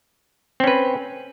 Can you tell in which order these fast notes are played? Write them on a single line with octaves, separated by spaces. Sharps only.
C4 C#4 B4